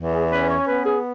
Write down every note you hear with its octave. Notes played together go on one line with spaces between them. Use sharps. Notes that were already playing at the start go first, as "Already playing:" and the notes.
Already playing: E2
G#4
C#4 B4
C#5
B3 B4
G#4